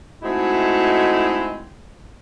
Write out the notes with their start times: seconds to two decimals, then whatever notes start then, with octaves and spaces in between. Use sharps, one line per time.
0.22 G#3 A3 C4 D#4 E4 F#4